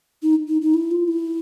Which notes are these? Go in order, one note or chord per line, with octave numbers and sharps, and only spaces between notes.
D#4
D#4
D#4
E4
F4
E4